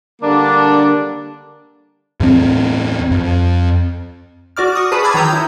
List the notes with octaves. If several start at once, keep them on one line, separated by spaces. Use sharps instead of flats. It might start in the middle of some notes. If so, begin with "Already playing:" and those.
D3 G3 A#3 D4
E2 A2 A#3 C4
F2
F#4 D5 D6 F6
C#6 D#6
G#4 B4 A5 B5 D#6
B5 D6 E6 F6 G#6 A6
D#3 C#5 A#5 D#6 E6 G6
E4